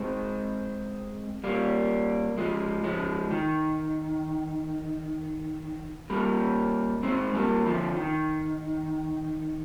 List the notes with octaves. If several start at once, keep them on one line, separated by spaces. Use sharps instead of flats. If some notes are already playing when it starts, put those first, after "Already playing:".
Already playing: G#3 C4
G3 A#3
F3 G#3
F3 G#3
D#3
G3 A#3
G#3 C4
G3 A#3
D3 F3
D#3